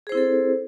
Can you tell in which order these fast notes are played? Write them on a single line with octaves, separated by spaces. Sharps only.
G#4 C5 E4 C4 A4